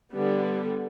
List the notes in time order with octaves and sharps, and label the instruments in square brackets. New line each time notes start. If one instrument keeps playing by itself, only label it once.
[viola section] D3 G3 B3